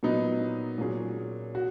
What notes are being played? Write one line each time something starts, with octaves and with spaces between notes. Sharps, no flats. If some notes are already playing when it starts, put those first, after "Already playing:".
A#2 F#3 B3 D#4
A#2 F#3 C#4 G#4
F#4